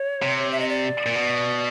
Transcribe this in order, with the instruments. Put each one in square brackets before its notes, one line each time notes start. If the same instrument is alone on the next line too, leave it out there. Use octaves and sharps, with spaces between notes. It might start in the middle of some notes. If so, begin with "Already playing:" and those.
Already playing: [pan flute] C#5
[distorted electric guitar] C3
[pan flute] E5
D#5
D5
[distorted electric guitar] A#2
B2